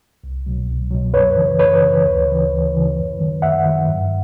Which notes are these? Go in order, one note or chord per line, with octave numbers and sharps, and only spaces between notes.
C2
B2 F#3
C2
B2 F#3
F#2 B4 C#5
C#3 E3
F#2 B4 C#5
C#3 E3
D2
C#3 E3
D2
C#3 E3
F#2
D#3 F#3
F#2 E5 F#5
D#3 F#3
G2